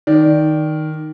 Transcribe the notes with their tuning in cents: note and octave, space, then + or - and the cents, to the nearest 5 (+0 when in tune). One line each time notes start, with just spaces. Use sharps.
D#3 +0 D5 +0